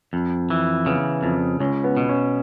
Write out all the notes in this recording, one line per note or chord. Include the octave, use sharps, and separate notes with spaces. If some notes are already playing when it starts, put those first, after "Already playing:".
F2
E3
C#3 B3
F2
C#2 C#4
B3
B2
C#4